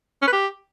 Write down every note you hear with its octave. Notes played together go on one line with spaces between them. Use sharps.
C#4
B4
G4